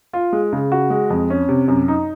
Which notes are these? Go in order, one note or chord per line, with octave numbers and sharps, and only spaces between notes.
F4
G#3
C#3
F#4
G#3
F2
C#4
C3
F#2
D#4